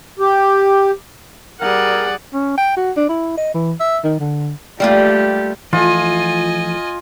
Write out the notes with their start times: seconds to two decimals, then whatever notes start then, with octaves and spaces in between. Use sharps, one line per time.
0.19 G4
1.61 G3 G#4 A#4 D5 F#5
2.34 C#4
2.57 G5
2.77 F#4
2.97 D4
3.09 E4
3.37 D#5
3.54 E3
3.80 E5
4.04 D#3
4.20 D3
4.80 G3 A3 A#3 F4 G4
5.73 E3 F3 A3 F4 D#5 G#5